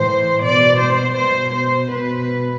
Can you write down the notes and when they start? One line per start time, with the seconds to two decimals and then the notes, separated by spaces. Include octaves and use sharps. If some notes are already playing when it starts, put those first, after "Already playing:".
Already playing: A2 E3 C5
0.43 B2 D5
0.81 C5
1.17 B2 C5
1.55 C5
1.92 B2 B4